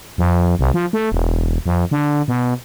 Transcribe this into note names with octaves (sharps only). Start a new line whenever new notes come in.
F2
C2
F3
A3
E1
F2
D3
B2